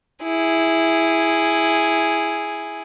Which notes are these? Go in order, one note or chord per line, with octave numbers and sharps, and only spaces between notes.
E4 G#4